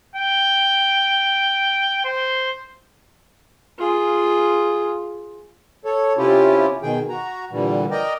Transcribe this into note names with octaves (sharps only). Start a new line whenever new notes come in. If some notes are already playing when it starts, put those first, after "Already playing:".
G5
C5
F4 G#4
A4 C#5
C3 C#4 E4 F4 G4
B2 D#3 G#4 G5
F#4 A#5
A#2 D3 E3 G3
A#4 D5 D#5 G5 A#5